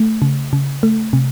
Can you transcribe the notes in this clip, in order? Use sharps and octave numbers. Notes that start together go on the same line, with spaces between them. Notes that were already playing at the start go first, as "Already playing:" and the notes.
Already playing: A3
C#3
C#3
A3
C3